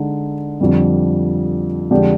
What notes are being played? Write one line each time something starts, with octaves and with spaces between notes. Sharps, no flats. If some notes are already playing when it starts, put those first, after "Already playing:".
Already playing: D3 G#3 D#4
F2 D3 G3
F2 D3 G#3 D4 G4